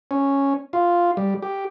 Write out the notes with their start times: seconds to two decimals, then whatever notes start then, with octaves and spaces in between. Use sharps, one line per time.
0.11 C#4
0.73 F4
1.17 G3
1.42 G4